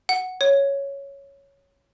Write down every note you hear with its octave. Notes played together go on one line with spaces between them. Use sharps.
F#5
C#5